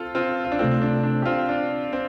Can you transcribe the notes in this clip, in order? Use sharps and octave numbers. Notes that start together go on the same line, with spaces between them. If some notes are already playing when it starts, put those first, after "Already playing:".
Already playing: C4 F4 A4
C4 F4
F4
D4
C3 A3 C4 F4 A4
D4
D4
G4
C4 F4
D4
C4